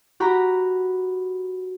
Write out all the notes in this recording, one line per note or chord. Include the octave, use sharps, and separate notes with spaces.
F#4 G4 A#5 B5